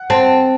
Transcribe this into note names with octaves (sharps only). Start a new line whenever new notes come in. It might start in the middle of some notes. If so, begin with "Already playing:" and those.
Already playing: F#5
C4 A5